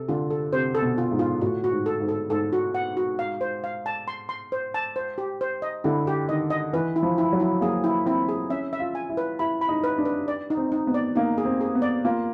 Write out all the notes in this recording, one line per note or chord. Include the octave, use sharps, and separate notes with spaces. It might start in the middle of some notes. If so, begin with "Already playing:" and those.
Already playing: C3 A4
D3 F4
A4
C3 C5
A4
B2
F4
G#2
F4
A2 F#4
F#4
G#2
A4
G#2
A4
G#2 A4
F#4
F#5
F#4
F5
C5
F5
A5
C6
C6
C5
A5
C5
G4
C5
D#5
D3 E4
G4
D#3 D#5
D#5
E3 B4
E4
F3
E4
F#3
E4
A#3 G#4
E4
C4 E4
G#4
C#4 E5
E5
F4
G#5
E4
B4
E4 B5
B5
D#4
B4
D4
B4
D5
D#4
C4
D#4
B3
D5
A#3 D#4
G#4
C4
G#4
B3
D5
A#3 F4